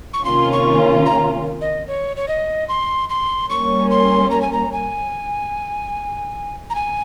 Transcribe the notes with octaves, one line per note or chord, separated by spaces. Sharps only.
C#6
C3 D#3 A#3 C#4 F4 C6
C#6
A#5
D#5
C#5
C#5
D#5
C6
C6
G3 A#3 C#4 C#6
C6
A#5
G#5
A#5
G#5
A#5
G#5